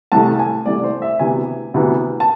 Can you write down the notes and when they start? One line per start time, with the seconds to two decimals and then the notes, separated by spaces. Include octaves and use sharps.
0.12 C2 C3 E3 A3 A5
0.39 G#5
0.66 C2 C3 E3 A3 D5
0.84 C5
1.02 E5
1.19 D2 C3 E3 B3 G#5
1.74 D2 C3 E3 B3
2.20 A5